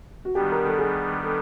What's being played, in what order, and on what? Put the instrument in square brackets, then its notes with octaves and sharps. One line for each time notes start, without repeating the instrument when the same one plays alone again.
[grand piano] F#4
[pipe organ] D#3 G3 B3 D4 [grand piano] G4
[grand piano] A#4
A4
G#4
A4